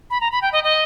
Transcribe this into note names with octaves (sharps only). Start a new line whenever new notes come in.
B5
A#5
B5
G5
D#5
D#5